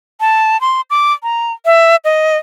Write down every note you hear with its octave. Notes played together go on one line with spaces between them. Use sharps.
A5
C6
D6
A#5
E5
D#5